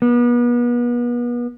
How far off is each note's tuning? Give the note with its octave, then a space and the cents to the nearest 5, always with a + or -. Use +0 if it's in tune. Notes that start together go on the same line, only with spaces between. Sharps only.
B3 -35